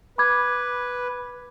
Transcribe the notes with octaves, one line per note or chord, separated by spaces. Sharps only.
B4 B5 D6 G#6